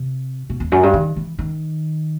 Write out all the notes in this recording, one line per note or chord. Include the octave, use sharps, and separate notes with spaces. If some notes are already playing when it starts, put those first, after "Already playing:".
Already playing: C3
B2
E2
F#2
G2
D#3
E3
D#3